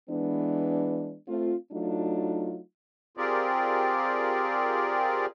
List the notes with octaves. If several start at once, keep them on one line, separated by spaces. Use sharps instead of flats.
E3 G#3 B3 D4
A3 C4 F4
F#3 A3 D4 D#4 F4
C4 F4 G4 G#4 A#4 D5